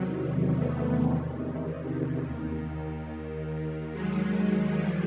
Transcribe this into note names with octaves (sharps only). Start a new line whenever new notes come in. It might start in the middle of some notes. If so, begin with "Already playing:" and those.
Already playing: E2 C3 D#3 F#3
A3 B3
D#2 D#3
F#3 G#3
F3 G3